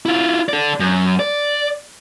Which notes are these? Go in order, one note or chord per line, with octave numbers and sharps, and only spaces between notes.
E4 F4
A4 D5
F#2
D5